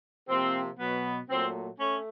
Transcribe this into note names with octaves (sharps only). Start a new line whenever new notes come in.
C3 F3 A#3 C4
B2 F#3 B3
A#2 F#3 A3 C4
A3 C#4